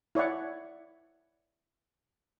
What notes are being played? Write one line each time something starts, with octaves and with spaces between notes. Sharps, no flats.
E4 C#5 D5 F#5